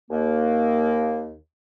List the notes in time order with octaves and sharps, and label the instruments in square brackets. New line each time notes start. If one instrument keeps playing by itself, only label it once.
[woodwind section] D#2 A#3